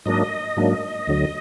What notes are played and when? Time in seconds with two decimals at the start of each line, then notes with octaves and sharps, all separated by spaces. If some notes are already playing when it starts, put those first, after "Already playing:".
0.06 G#2 F#3 A#3 D4 D#5
0.57 G#2 F#3 A#3 D4
1.07 D2 D3 F#3